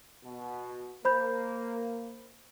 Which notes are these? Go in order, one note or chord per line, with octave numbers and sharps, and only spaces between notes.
B2
A#3 C5 B5 G6